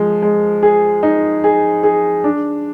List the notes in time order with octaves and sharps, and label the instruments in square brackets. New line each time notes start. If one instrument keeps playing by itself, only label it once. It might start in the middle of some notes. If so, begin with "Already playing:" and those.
Already playing: [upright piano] F3 G#3
G#3
G#4
D#4
G#4
G#4
D4